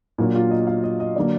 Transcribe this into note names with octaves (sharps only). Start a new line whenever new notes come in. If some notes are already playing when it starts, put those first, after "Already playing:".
A#2 F#3 A#3 D4
F4
D#5
F5
D#5
D#5
D3 F#3 A#3 D5